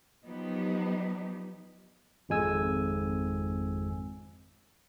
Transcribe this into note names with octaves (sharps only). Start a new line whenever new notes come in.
F3 F#3 B3 D#4 G4
G#1 F2 G#3 G#5 E6